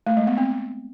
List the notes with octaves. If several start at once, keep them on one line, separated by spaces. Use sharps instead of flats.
A3
G#3
B3
C4